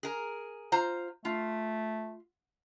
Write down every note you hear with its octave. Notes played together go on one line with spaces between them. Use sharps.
G#4 A#4
F4 C5 A#5
A3 F4